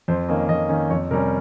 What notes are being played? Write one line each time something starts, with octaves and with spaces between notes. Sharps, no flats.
F2 C5
D#3 A#3 C#4 D#5
F2 D#5
D#3 A#3 C#4
F2 C#5
C3 G3 C#4 A#4